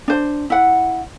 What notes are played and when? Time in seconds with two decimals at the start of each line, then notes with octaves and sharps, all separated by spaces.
0.08 D4 C5
0.50 E4 F#5